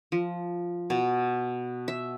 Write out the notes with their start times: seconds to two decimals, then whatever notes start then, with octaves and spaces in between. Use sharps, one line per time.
0.12 F3
0.90 B2
1.88 E5